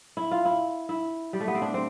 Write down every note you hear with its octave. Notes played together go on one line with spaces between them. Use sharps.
E4
F4
E4
E4
G3
A3
B3
C4
D4
C4